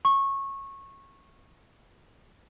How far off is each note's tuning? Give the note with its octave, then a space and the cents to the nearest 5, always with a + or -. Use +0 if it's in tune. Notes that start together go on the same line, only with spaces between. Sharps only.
C#6 -20